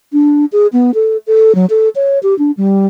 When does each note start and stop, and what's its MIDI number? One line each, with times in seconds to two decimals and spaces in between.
0.13 0.45 62
0.52 0.67 68
0.73 0.91 59
0.94 1.17 69
1.27 1.55 69
1.55 1.66 54
1.70 1.89 69
1.95 2.19 73
2.23 2.37 67
2.39 2.51 62
2.57 2.87 55